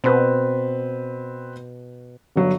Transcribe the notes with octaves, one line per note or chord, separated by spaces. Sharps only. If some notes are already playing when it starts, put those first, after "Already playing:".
B2 C4 B4
G1 F#3